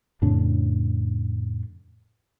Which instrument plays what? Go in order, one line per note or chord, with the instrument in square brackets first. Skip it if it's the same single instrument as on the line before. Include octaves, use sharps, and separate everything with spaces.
[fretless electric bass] F2 A2 C#3 D4